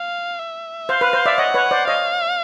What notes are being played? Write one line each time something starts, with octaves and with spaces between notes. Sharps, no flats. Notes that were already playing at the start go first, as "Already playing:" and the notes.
Already playing: F5
E5
C5 F5
B4
C5
D5 E5
C#5 D#5 F#5
B4 C#5
C5 D5
C#5 D#5 F5